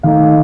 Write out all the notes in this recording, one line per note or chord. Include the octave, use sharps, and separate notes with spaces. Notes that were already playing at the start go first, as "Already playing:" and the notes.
D#3 A3 D#4 F5